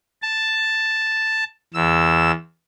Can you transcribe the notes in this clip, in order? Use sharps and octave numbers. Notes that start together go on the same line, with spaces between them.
A5
E2 E6